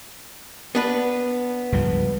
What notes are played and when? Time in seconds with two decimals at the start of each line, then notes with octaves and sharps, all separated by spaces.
0.75 B3 D4 B4
1.72 C#2 G2 F3